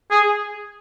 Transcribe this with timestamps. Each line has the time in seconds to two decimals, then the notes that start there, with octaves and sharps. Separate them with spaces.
0.11 G#4